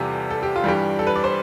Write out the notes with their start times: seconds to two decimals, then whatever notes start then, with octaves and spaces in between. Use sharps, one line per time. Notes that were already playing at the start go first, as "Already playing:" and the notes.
Already playing: E2 C3 E3 G3 F4 G4 A4
0.30 A4
0.43 G4
0.56 F4
0.64 G2 E3 G3 G4
0.99 A4
1.07 B4
1.16 D5
1.24 C5